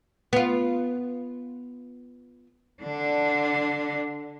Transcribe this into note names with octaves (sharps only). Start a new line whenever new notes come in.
B3 F4
D3 D4